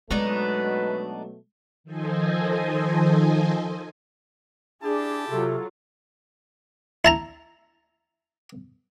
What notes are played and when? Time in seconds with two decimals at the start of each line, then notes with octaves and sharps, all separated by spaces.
0.11 B2 F#3 G#3 A3 B3 D4 D#4 B4
1.84 D#3 F3 A4 C5 D#5 G#5
4.83 D4 E4 G4 G#4 A5
5.29 C3 F#3 F4 A4
7.05 E4 A5 A#5